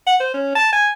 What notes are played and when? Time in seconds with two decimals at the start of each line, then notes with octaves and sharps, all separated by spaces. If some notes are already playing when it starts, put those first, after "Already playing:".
0.07 F#5
0.20 C5
0.34 C#4
0.55 A5
0.73 G#5